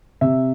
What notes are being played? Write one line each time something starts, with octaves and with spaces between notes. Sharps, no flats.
C3 E5